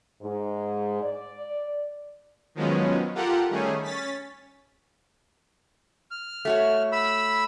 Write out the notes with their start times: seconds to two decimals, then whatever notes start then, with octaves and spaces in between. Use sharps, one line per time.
0.22 G#2
1.03 D5
2.55 D#3 F3 F#3 G#3 B3 C#4
3.15 F4 G4 A4 A#4 F#5
3.49 D#3 G3 A3 C#4 G#4
3.83 C#4 A6 B6
6.11 F6
6.45 A3 F#4 C#5
6.92 B5 E6